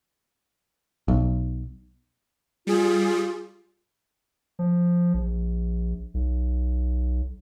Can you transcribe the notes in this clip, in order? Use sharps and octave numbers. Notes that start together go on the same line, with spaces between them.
B1
G3 F4 G#4
F3
A#1
B1